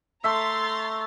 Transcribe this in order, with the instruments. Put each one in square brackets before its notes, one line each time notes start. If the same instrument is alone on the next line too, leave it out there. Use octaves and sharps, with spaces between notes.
[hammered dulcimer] A3 E5 [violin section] A#5 C6 A6